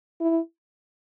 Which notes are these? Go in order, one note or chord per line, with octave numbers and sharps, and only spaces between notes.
E4